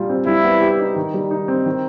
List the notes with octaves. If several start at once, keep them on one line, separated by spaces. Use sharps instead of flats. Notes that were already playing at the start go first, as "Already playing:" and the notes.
Already playing: A#2 G3 F4
C4
G3 E4
B3
G4
D#4
D#3
G3
D#4
C4
D#3